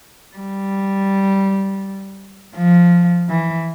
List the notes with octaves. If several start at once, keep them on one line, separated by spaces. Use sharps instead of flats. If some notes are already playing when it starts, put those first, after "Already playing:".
G3
F3
E3